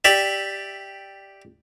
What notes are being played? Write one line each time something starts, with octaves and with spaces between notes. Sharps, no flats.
G4 D5 E5